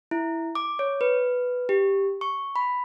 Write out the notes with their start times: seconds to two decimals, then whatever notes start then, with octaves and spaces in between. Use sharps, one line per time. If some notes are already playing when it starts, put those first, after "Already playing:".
0.11 E4
0.55 D6
0.79 C#5
1.01 B4
1.69 G4
2.21 C#6
2.56 B5